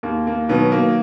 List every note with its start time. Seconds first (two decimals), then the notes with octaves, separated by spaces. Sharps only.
0.03 D#2 A#3
0.27 A#3
0.49 B2 D#3 F#3 B3
0.72 A#3